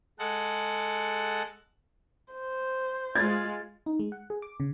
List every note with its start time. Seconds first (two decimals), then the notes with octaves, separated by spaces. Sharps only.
0.19 G#3 A4 F#5
2.33 C5
3.15 G#3 F4 G#6 A6
3.86 D#4
4.00 G#3
4.12 F#5
4.30 G#4
4.42 D6
4.60 C#3